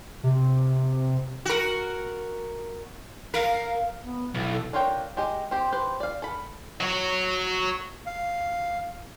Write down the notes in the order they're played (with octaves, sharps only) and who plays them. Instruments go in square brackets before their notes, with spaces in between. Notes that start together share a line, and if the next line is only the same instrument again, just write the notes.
[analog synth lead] C3
[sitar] F#4 A#4
[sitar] A#4 [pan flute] F5
[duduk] B3
[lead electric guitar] B1 [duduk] E4
[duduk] A4
[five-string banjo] D4 F4 A#4 C#5 G5
G#3 G4 D#5
C4 G4 C5
G4 B4 C5
D5 F5
A4 B5
[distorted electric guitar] F#3 F#4
[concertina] F5